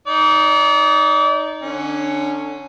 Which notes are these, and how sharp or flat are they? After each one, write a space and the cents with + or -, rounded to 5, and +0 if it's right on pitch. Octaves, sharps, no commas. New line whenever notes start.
D#4 +0 D5 -35
D3 +25 C#4 +0